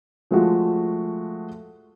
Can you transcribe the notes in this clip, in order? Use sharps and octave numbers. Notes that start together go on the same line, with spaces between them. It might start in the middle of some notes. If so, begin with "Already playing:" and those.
F3 G#3 A3 F4 F#4